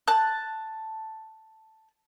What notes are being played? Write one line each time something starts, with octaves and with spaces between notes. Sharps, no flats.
A5 F#6